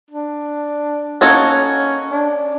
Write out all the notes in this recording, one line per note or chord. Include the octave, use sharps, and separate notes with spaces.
D4
A#3 C#4 D#4 F#4 A4 C#5
D4